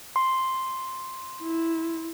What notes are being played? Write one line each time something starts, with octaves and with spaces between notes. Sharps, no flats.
C6
E4